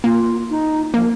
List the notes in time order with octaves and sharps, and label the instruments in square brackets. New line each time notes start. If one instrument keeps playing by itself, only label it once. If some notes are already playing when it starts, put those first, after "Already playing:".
[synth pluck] A#3 [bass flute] F4
[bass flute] D#4
[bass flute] F3 [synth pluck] A#3